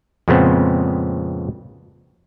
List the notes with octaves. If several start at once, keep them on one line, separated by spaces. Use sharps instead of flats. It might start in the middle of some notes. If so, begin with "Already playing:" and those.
F2 A#2 C#3 G#3 B3 C4